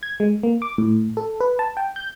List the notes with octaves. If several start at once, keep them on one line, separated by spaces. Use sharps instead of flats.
G#6
G#3
A#3
D6
A2
A4
B4
A5
G5
G6